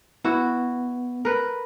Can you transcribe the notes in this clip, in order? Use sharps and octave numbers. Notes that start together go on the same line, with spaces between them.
B3 E4 F#4
A#4 B4